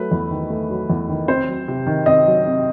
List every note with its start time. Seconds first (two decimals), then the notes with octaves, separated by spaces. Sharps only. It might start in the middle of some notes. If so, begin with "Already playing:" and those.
Already playing: F#3 A3 B4
0.11 E2
0.31 D#3
0.50 A3
0.70 F#3
0.90 E2
1.09 D#3
1.28 C4 C5
1.48 F#3
1.68 C3
1.87 D#3
2.06 C4 D#5
2.26 F#3
2.46 C3